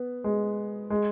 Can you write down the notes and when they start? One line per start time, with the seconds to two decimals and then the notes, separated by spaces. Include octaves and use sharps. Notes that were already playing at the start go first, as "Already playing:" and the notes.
Already playing: B3
0.24 G#3
0.90 G#3